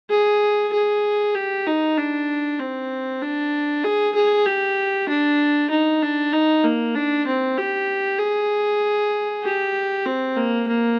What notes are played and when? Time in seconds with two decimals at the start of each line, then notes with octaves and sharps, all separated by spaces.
0.10 G#4
0.73 G#4
1.35 G4
1.66 D#4
1.98 D4
2.59 C4
3.22 D4
3.84 G#4
4.15 G#4
4.46 G4
5.09 D4
5.70 D#4
6.02 D4
6.32 D#4
6.64 A#3
6.95 D4
7.26 C4
7.58 G4
8.19 G#4
9.44 G4
10.06 C4
10.36 A#3
10.68 A#3